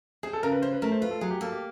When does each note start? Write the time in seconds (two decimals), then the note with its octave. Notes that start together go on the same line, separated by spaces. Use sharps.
0.23 C4 G#4
0.33 A4
0.43 C#3 A#4
0.52 B4
0.62 C#4 C5
0.73 B4
0.82 A3 A#4
0.92 C5
1.01 F4 B4
1.11 A4
1.21 F#3 G#4
1.31 G4
1.41 A#3 A4
1.52 G4